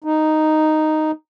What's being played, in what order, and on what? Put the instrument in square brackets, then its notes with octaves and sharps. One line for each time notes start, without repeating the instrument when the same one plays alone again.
[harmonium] D#4